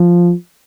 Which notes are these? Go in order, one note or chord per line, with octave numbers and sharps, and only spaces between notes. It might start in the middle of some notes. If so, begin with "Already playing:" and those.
Already playing: F3